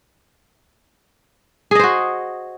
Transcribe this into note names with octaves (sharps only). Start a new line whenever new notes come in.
F#4 G#4 C5 D#5